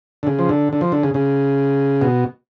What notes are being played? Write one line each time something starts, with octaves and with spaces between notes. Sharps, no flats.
D3
C#3
F3
D3
D3
F3
D3
C#3
C#3
B2